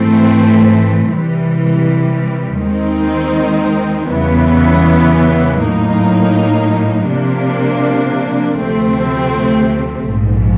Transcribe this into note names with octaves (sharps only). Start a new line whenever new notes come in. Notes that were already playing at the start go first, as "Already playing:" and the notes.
Already playing: G#2 E3 A3 C4
C3 E3 G3
D#2 D#3 G#3 C4 D#4
E2 C#3 E3 G3 B3
A2 F#3 A#3 D#4
C3 F3 A#3 D4
D2 C3 F3 A3 C4
A#1 G#2 F3